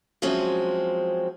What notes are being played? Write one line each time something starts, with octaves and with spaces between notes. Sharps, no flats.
F3 F#3 G#3 C4 C#4